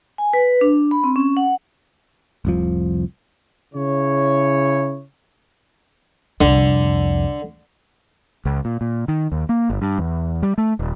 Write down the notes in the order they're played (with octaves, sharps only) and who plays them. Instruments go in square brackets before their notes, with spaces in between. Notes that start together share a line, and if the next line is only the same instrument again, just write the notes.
[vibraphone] G#5
B4
D4
B5
C4
C#4
F#5
[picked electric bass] F1 C2 F3
[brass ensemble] C#3 E4 C#5
[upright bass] C2 F2 [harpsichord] D3
[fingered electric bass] C#2
A#2
A#2
D#3
D#2
A#3
G1
G2
E2
G3
A3
D#1